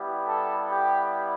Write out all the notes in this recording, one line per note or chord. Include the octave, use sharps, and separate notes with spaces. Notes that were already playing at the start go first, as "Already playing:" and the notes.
Already playing: G3 B3 E4 G4
A4
G4